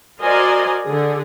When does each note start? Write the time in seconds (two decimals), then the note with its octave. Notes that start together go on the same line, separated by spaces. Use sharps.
0.22 F#4 A#4 C5 D5 D#5 G#5
0.86 D3 G#4